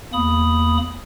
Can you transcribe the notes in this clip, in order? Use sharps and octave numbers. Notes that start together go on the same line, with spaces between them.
E2 A#3 B5 D#6